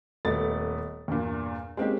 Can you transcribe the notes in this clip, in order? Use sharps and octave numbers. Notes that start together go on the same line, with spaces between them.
D#1 A3 B3 D#5 A6
E2 G2 A#2
G#3 A#3 C4 C#4 D#4 G4